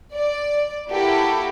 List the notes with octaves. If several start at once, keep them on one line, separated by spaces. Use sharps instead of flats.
D5
A#3 E4 F#4 G4 A4